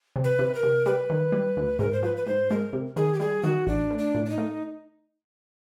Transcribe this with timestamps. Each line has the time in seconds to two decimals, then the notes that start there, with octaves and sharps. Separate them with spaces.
0.16 C3
0.24 B4
0.39 C3
0.55 A#4
0.63 C3
0.86 G3 B4
1.10 D#3
1.32 G3
1.57 D2
1.79 G#2 A#4
1.93 C5
2.03 F3 B4
2.17 B4
2.26 G#2 C5
2.50 G#3 A#4
2.73 C3
2.96 D#3 G#4
3.14 G4
3.20 G3 G#4
3.43 D#3 F#4
3.66 A1 D4
3.91 A3
3.98 D4
4.15 A2
4.26 D4
4.30 D#4
4.38 A3